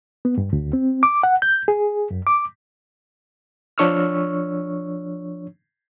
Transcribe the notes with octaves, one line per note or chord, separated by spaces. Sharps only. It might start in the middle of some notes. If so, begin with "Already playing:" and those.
B3
G2
D2
C4
D6
F#5
G6
G#4
F#2
D6
F3 D4 C#5 C#6 E6 F6